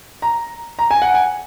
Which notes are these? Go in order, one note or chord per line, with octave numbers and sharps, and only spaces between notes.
A#5
A#5
G#5
F#5
G#5